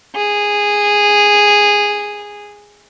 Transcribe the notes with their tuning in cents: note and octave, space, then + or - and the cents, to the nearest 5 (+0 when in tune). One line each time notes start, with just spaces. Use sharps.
G#4 -10